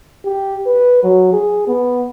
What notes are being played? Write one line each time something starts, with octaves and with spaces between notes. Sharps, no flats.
G4
B4
F#3
G#4
B3